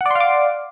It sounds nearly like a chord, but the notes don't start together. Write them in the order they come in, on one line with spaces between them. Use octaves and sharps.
F#5 D5 C6 F5 D6